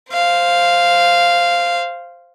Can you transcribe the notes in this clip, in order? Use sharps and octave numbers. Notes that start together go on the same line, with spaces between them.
C5 F5